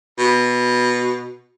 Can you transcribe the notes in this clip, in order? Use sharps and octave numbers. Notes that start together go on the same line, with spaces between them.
B2